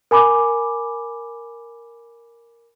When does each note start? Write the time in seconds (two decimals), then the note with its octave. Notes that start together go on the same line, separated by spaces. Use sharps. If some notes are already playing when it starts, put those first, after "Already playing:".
0.11 A#4 G#5 B5 D6